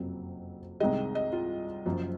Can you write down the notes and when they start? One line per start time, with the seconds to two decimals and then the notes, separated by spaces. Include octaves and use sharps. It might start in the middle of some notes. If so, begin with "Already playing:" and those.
Already playing: F#1 F2 C3 F#3
0.80 C2 C3 D#3 G#3 D#5
1.15 D#5
1.33 F4
1.86 F#1 F#2 F3